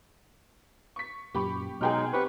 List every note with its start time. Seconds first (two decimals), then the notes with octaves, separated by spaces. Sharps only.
0.96 C#6 B6
1.35 F#2 A#2 G4 B5 C#6
1.81 B2 F#3 G#3 D#4 G#4 G5 F6
2.13 B3 C4 G4 B4 C#6